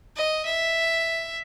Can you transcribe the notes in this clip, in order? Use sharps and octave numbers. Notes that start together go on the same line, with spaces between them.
D#5
E5